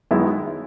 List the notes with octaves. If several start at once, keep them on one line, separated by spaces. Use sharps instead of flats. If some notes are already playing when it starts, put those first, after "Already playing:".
F#2 D#3 G#3 B3 E4